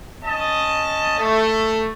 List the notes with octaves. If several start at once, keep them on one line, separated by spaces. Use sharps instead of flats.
C#4 D#5 A5
A3